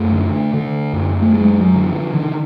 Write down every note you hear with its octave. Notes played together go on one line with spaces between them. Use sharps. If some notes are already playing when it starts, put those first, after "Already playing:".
Already playing: F#2 A3
D3
D3
F#2
A3
F#2 G#3
F#3
D3
F3
D3 D#3